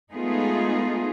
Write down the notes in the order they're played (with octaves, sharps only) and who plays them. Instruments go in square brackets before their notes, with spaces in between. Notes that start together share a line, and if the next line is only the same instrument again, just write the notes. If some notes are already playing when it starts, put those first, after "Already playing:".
[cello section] G#3 A3 B3 D#4 F4 G#4